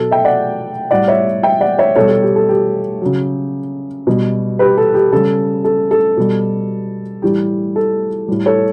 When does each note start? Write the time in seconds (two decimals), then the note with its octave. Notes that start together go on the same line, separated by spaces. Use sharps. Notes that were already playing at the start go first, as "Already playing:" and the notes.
Already playing: B2 F#3 A4
0.11 E5 G5
0.25 D5 F#5
0.91 A2 G3 D5 F#5
1.08 C#5 E5
1.43 E5 G5
1.61 D5 F#5
1.78 C#5 E5
1.96 B2 A4 C#5
2.01 G3
2.09 A4
2.22 G4
2.36 A4
2.49 G4
3.01 C#3 F#3
4.07 B2 G3
4.59 G4 B4
4.78 A4
4.94 G4
5.12 C#3 G3 A4
5.64 A4
5.91 A4
6.17 B2 G3
7.22 A2 E3 G3 G4
7.76 A4
8.28 A2 G3
8.46 A4 C#5